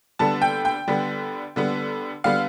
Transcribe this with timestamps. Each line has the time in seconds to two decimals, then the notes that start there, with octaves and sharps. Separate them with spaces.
0.19 D3 G3 B3 A5
0.42 G5
0.65 G5
0.88 D3 G3 B3
1.56 D3 G3 B3
2.24 D3 G3 B3 F5